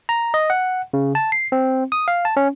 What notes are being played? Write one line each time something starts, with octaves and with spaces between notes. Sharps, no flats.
A#5
D#5
F#5
C#3
A5
C7
C4
D#6
F5
A5
C#4